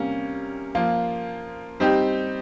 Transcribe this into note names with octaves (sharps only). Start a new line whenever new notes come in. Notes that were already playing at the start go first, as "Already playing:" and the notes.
Already playing: C3 G3 A#3 C#4
F3 A#3 F4
G3 C4 D#4 G4